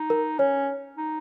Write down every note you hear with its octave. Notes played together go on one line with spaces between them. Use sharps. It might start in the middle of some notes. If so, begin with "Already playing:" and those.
Already playing: D#4
A#4
C#4 C#5
D#4